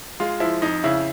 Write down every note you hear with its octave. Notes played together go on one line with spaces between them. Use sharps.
G#3 F4
F3 E4
F2 D#4
C#3 E4